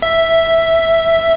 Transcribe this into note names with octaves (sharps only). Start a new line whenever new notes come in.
E5